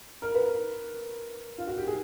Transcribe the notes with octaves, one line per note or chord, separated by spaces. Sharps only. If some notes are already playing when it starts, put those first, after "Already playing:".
A#4
B4
A#4
F4
F#4
G4
G#4